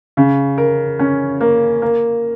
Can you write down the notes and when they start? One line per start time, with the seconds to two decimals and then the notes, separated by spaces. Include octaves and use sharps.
0.17 C#3
0.58 A#4
0.99 C#4
1.41 A#3
1.82 A#3